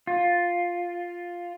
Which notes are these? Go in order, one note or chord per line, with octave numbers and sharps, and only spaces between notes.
F4